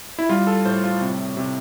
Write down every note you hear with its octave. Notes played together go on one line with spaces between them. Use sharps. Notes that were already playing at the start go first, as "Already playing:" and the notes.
E4
G3 F4
A4
A2 C5
F4
C3
C3